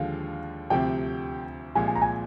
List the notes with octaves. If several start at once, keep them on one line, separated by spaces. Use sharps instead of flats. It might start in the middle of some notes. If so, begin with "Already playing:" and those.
Already playing: D#2 D3 F3 G#3 F5
D2 C3 F3 C4 G4 G5
C2 A#2 F3 G#3 G#5
G#5
A#5
G#5